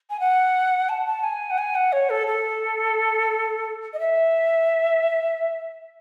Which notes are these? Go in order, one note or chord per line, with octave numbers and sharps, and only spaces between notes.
G#5
F#5
A5
A5
G#5
F#5
G#5
F#5
C#5
A4
A4
D#5
E5